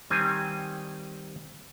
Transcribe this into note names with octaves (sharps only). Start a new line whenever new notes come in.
D#3 G3 C4 G#5